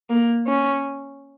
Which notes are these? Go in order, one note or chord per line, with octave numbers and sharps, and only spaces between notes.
A#3
C#4